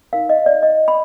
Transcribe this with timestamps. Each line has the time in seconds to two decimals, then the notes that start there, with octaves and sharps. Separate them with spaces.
0.13 D#4 A#4 F5
0.29 D#5
0.46 D5
0.63 D#5
0.88 B5